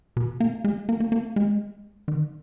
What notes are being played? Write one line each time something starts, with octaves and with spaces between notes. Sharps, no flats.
B2
A#3
G#3
A#3
A#3
A#3
G#3
D#3